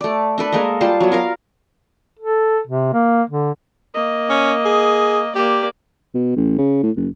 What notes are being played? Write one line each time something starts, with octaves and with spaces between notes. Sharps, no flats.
A3 D5
D4 A4 B4
G#3 A#3 A4 D#5
G3 F4 C5 A5
F#3 B3
F4 A#4 F5
A4
C3
A#3
D3
A#3 D#5
C#4
G#4
A#3 G4 D5
B2
A1
C#3
A2
F#1